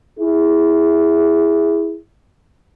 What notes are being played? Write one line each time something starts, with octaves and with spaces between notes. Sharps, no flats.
E4 G#4